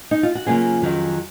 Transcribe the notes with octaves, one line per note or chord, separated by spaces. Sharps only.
D#4
F4
F#4
C#3 F#3 A#3 C#4 F4 G#4
F2 D#3 F#3 C#4